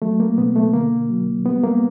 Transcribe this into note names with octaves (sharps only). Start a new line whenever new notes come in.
F#3 A3
A#3
B2 B3
A3
D3 A#3
F#3
G3 B3
A#3